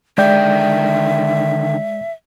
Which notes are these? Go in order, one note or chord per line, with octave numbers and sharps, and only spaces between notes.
D3 D#3 G#3 D5 E5 G5 G6